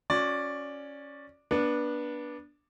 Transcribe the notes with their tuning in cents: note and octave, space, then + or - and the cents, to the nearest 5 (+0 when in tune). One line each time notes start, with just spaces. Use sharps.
C#4 +0 F#4 -30 D5 +0
B3 -25 D4 +0